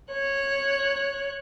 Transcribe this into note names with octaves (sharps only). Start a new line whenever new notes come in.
C#5 F#6